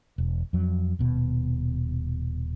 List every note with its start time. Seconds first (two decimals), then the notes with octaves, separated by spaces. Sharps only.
0.18 E1
0.53 F2 F#3
0.99 D#1 B2